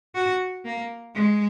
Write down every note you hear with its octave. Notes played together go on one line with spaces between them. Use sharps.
F#4
A#3
G#3